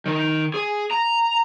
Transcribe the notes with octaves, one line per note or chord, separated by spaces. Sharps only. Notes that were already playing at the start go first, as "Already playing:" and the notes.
D#3
G#4
A#5